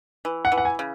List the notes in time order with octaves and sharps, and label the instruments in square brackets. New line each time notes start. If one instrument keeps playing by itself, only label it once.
[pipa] E3
[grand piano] F#5
[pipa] E3
[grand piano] F#5
G#5
[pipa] C#3